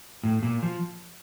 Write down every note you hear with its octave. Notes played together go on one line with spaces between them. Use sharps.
A2
A#2
F3